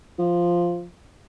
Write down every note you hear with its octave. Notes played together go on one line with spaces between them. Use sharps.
F3